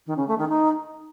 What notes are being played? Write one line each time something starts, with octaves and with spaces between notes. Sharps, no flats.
D#3
C#3
A3
D#3
D#4